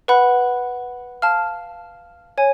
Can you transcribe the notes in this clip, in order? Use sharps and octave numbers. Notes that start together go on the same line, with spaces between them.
B4 F#5 B5 F#6
F5 A5 F6
C#5 G#5